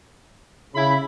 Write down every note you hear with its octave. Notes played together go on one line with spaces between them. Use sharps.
C#3 E4 B5